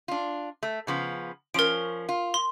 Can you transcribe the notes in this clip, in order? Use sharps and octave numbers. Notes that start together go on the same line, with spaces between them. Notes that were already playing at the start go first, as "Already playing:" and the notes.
D4 F4
A3
C#3 F3 B3
F3 C#4 A#4 D7
F4
C6